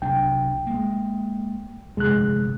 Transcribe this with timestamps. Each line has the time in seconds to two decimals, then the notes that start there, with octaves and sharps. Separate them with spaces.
0.02 C2 F#3 D4 G5
0.67 G#3 A#3
1.97 F1 D2 G2 G#3 F#6